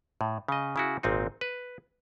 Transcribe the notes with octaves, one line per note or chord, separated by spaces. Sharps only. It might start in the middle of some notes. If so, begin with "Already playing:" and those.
A2
C#3 D#5
C#3 E4 F#4
G#1 A#2 C4 D#4
B4